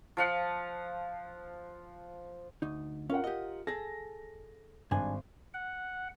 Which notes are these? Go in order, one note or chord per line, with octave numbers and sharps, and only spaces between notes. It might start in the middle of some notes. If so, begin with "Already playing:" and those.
F3 F5 F#5
D2 D#4
C#4 F4 A#4 F#5
G4 D#5
G#4 A4 A#6
G#1 G2 D4 G#5
F#5